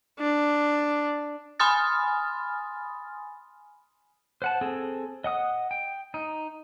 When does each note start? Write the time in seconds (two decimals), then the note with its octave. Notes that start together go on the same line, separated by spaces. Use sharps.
0.19 D4
1.60 G#5 B5 C6 D#6 F6 A6
4.42 C5 F#5 A5
4.61 C4 G#4 A4
5.24 D#5 F#5 D#6
5.71 G5
6.14 D#4